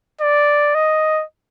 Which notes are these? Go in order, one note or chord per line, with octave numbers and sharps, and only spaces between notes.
D5
D#5